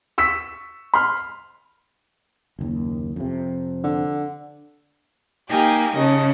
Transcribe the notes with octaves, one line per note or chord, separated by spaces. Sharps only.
C#6 E6 B6
B5 C6 F6
F#1 D#2
F2 C3
D3
A#3 D#4 G4 G#5
C#3 D#5 A5